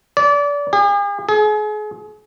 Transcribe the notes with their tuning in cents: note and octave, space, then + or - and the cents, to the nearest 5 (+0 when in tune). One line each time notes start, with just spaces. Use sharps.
D5 -30
G#4 -45
G#4 +35